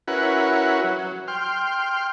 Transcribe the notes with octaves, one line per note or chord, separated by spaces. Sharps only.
C#4 E4 F#4 A#4 B4 F#5
F#3
G5 C6 F6